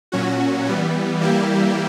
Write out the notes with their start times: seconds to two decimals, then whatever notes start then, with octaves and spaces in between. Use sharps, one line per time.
0.12 A#2 F#3 C#4 F#4
0.66 E3 G3 B3
1.21 E3 G3 A#3 E4 G4